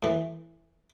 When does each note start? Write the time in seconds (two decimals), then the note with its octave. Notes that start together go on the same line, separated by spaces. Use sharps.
0.03 A2 E3